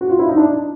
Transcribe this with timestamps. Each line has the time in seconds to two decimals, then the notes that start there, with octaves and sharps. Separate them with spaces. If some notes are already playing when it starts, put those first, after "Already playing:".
0.01 F#4
0.10 F4
0.19 E4
0.29 D#4
0.37 D4